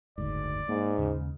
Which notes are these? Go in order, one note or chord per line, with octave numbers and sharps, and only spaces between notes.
F#1 D2 G#2 D5
G#2 A#3
D#2 C#3